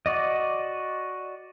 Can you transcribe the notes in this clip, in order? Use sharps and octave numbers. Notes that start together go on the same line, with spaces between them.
F#4 D5 D#5